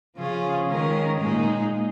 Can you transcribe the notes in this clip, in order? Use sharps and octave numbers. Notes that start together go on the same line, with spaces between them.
C#3 F3 C#4 F4 G#4
D#3 G#3 C#4 A#4
A#2 G#3 D#4 G#4